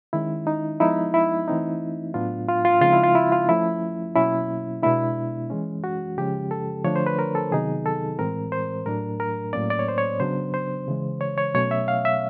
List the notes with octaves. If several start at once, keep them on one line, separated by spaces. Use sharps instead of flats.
D#3 G#3 C#4 E4
D#4
F3 G#3 B3 D#4 E4
E4
E3 A3 C4 D#4
A2 F#3 B3 D4 F4
F4
F4
C#3 F3 G#3 C4 D#4 F4
E4
F4
E4
F4
F3 A3 C#4 E4
B2 F#3 A#3 C#4 E4
B2 G#3 B3 D4 E4
E3 G#3 C#4
F#4
C#3 F3 G#3 C#4 G4
A4
D3 F3 A3 D4 C#5
C5
B4
A#4
A4
C3 D#3 F#3 B3 D#4 G#4
A4
A2 E3 G#3 C4 A#4
C5
A2 F#3 A3 D4 A#4
A#4
A2 F#3 A#3 C#4 D5
D5
C#5
C5
C#5
C#3 F#3 B3 D4 C5
C5
C#3 E3 G#3
C#5
C#5
B2 F#3 A3 C#4 C#5
E5
F5
E5